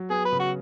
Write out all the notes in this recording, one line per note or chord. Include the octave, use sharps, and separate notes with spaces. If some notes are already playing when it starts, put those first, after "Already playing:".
Already playing: F#3
B3 G#4
B4
C#3
F#4